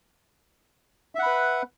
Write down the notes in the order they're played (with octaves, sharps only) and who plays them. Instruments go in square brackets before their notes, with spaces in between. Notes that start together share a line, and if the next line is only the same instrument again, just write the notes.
[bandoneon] E5
F#5
B5
B4